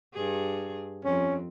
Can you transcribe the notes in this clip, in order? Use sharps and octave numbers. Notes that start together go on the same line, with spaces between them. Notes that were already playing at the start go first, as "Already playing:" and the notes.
G2 G#4
F2 C#4